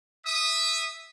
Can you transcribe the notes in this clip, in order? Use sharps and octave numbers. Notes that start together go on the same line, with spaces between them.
E5 D#6